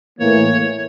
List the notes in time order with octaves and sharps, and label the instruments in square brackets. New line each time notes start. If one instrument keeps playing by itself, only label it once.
[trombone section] A2 E3 A#3 [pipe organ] C#5